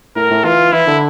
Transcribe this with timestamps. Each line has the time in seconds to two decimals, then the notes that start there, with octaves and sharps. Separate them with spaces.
0.16 A2 A#4
0.31 A2
0.44 E3 F4
0.73 E3 E4
0.87 D3